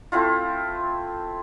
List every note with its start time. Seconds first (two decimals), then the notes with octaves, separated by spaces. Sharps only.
0.12 A3 C4 E4 F4